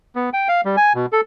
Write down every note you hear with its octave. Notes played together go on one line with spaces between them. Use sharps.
B3
G5
F5
G3
G#5
B2
A4